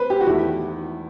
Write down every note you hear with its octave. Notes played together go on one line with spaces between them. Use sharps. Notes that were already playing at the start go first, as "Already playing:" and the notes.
Already playing: B4 C5
G4
F#4
E2 D#3 A3 E4